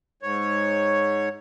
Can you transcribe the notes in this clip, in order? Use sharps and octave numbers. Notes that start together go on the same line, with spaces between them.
G#2 C#5